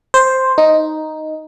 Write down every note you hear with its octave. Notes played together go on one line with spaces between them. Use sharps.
C5
D#4